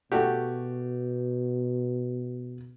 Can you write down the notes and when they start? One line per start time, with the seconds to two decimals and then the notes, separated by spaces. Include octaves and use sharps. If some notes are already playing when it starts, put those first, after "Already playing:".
0.12 B2 A3 F#4 G4